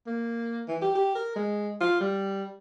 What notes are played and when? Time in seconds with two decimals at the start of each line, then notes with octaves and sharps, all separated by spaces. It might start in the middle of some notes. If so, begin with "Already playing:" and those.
0.07 A#3
0.68 E3
0.82 G4
0.95 G4
1.15 A#4
1.36 G#3
1.81 F4
2.01 G3